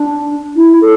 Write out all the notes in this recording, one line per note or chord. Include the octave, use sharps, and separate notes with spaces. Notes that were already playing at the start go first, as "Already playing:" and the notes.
Already playing: D4
E4
A4